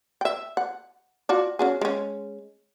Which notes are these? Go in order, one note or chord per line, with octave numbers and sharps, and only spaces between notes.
E5 G5
F#5
F4 F#4 D5
C#4 F#4 G#4
G#3 C#4